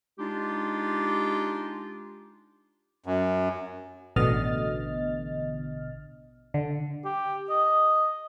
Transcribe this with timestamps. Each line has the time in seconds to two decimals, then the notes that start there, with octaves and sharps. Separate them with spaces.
0.19 G#3 D4 D#4 F4 G4
3.06 F#2
4.16 A1 B2 D3 D#5 F6 A6
6.54 D3
7.05 G4
7.49 D#5